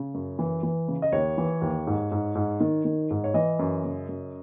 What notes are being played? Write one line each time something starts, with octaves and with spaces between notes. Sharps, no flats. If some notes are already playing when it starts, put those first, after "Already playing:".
Already playing: C#3
F#2
E3
E3
C#3
D#5
D#2 C#5
E3
D#2
G#2
G#2
G#2
D#3
D#3
G#2
C#5
E3 D#5
F#2
C#3
F#2